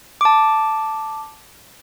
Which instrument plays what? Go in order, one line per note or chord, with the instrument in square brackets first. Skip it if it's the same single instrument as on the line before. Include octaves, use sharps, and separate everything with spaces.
[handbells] A5 D6